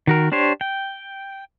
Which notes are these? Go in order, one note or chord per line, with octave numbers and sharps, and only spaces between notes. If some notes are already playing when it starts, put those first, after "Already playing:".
D#3 F#4 A#4
D4 G4 C5 C#5
G5